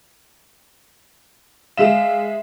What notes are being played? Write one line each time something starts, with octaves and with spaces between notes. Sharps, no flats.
G#3 G#4 E5 F5 E7